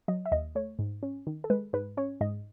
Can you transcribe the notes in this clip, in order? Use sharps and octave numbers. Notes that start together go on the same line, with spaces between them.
F#3 D#5
E5
D#2 D#5
A3 C#5
G#2
C#4
D#3
A4
G#3 B4
G#2 B4
C#4 C#5
G#2 D#5